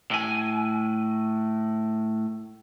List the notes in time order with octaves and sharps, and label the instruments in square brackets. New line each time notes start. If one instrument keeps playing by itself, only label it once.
[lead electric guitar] A2 G#5